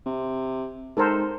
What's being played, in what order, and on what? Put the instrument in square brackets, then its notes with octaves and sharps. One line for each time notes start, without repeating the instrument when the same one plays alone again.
[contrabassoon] C3
[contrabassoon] G#2 [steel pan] A4 A#4 C5